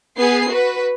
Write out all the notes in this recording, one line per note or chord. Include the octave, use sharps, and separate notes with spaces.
B3 G#4 C7
F#4 B4